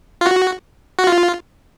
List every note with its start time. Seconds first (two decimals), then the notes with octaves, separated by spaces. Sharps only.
0.21 F4
0.26 F#4
0.99 F#4
1.07 F4